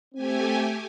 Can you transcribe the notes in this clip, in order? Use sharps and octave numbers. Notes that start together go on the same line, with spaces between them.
A3 C4 G4 G#5